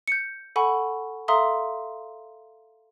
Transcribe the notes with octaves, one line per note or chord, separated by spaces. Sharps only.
G6 C#7
A4 F#5 G#5 B5 C#6
A4 E5 F5 A#5 C6 D#6